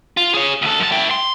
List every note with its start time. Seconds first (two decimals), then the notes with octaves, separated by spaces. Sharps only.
0.17 F4
0.34 G#4 C#5
0.62 D2 A4
0.80 F#2 A5
0.92 E4 G5
1.11 C6